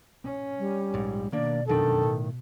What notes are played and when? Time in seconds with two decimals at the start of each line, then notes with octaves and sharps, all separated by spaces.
0.25 C#4
0.59 G3
0.94 A#1 G#2
1.32 B2 D#3 A#3 D4 D5
1.68 F1 F#2 D#3 D4 A4
2.03 A2